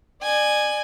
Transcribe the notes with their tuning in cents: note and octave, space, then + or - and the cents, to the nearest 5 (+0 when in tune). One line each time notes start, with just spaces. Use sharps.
D5 +35 G#5 +0